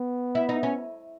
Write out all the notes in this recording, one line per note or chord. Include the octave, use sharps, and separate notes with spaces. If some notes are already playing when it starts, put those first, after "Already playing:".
Already playing: B3
E4
D#4
C#4